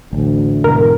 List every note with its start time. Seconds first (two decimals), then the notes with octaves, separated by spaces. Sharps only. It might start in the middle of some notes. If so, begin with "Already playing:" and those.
0.13 A1 D2
0.64 G#2 B2 E3 A#4